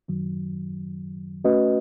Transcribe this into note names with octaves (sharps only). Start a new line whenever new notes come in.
F#2 D#3 F#3
A3 C#4 F#4 B4 D#5